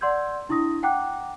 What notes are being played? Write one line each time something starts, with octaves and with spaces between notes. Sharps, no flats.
D5 F#5 C6 E6 G6 G#6
D4 E4 C#6 D#6 A#6
F#5 G5 A#5 D6 F#6